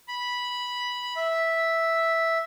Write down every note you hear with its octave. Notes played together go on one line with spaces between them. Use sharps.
B5
E5